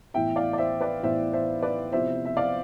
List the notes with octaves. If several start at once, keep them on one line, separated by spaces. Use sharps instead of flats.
A2 E3 B3 E4 E5 G5
D5 F5
D5
C5 E5
B4 D5
A2 E3 B3 E4 C5 E5
C5 E5
B4 D5
C3 F3 B3 E4 C5 E5
E5
D5 F5